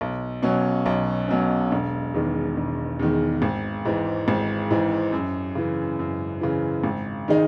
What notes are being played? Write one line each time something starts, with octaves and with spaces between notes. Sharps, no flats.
B1
B2 F#3 C#4
B1
B2 F#3 C#4
E1
E2 D#3 G#3
E1
E2 D#3 G#3
G#1
G#2 E3 G#3
G#1
G#2 E3 G#3
F#2
C#3 E3
F#2
C#3 E3
G#1
D#3 G#3 D#4